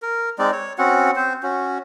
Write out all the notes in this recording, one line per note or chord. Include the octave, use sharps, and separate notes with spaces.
A#4
G#3 C4 D#4 D5
C#5
C4 C#4 F#4 F#5
C4 C5
C#4 F#4